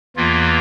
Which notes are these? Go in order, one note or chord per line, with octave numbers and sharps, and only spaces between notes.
E2 E3 A#3 F4